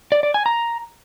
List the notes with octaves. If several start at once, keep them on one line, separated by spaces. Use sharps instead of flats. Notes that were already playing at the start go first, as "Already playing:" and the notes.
D5
D5
G#5
A#5